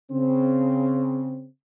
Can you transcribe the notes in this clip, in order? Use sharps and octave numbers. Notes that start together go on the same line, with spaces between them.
C#3 C4